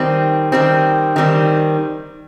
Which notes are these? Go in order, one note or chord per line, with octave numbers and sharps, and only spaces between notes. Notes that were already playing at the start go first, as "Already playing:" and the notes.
Already playing: D#3 G3 C4
D#3 G3 C4
D#3 G3 C4